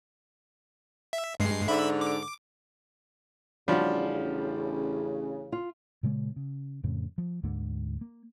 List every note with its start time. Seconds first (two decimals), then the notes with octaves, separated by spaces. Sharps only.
1.13 E5
1.40 G2 G#3 C7
1.68 G#2 D3 E5 B5
2.01 D6
3.68 A1 C#3 F3 G3 D4 F#4
5.52 F4
6.03 A#2 C#3 G#3 A#3
6.36 C#3
6.84 F2 A2 C#3
7.18 F3
7.43 D2 G#2 D3 A#3
8.01 A#3